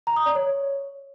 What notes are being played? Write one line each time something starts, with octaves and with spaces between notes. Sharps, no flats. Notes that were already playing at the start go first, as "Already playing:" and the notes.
A#5
D#6
D5
C#5